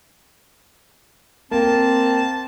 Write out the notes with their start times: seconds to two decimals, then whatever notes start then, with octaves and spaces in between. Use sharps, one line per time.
1.51 A#3 C4 A5